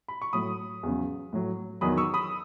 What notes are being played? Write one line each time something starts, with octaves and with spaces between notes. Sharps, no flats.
B5
C#6
A2 F#3 B5 D#6
E2 C#3 F#3
A2 F#3
E2 D#3 F#3 B5 D#6
C#6 E6
B5 D#6